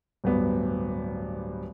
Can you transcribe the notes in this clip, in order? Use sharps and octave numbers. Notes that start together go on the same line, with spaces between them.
D1 G2 B3